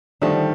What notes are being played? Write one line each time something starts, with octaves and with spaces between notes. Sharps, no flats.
D3 D#3 F3 G3 A3